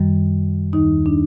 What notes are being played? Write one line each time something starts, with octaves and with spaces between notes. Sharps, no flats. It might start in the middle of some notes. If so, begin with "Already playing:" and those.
Already playing: F#2 D#3 G3
D#2 D#3 G3 D#4
D4